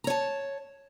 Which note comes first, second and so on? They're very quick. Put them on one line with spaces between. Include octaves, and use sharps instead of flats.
A#5 C#5 A5